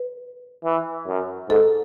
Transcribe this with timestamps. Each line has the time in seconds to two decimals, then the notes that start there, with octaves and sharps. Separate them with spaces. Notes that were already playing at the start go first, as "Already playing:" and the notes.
Already playing: B4
0.64 E3
1.07 F#2
1.49 G#2 A4